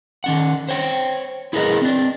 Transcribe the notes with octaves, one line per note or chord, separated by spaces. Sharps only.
D#3 C#4 F#5
C5 C#5 G5
E4 G#4 A#4 B4 D#5
C4 D4